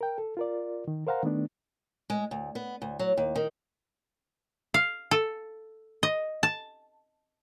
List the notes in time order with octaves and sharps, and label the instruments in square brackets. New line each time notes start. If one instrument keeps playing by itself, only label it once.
[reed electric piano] A#4 G5
A4
F4 A#4 D5
D#3
A#4 C5 F5 F#5 A#5
D#3 A3 B3 D4
[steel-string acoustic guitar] G#3
D2
B3
D2
F#3
D#2
D#3
[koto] F5
A4
D#5
A5